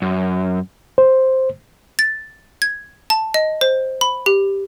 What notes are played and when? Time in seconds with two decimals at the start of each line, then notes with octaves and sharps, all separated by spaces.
0.02 F#2
0.98 C5
1.99 A6
2.62 G#6
3.10 A5
3.34 D#5
3.61 C5
4.01 B5
4.26 G4